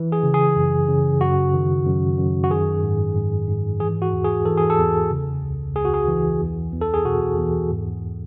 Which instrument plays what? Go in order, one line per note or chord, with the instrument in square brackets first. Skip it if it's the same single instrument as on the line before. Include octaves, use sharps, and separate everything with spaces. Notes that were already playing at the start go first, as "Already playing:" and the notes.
Already playing: [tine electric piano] E3
G#4
C#3
G#4
F#2
C#3
F#2 F#4
D#3
F#2
F#2
F#4
D#3 G#4
G#2
G#2
G#2
E3 G#4
F#4
E2
G#4
E3 A4
G#4
A4
E2
C#3
C#2
C#2 G#4
F#4
G#4
E3
E2
E2
A4
G#4
B2 F#4
E2
G#2